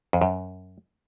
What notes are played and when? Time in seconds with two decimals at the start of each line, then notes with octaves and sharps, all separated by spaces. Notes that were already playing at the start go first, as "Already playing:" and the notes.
0.13 F2
0.22 F#2